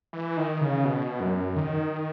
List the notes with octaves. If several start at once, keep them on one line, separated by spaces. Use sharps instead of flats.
E3
D#3
C#3
B2
F#2
D#3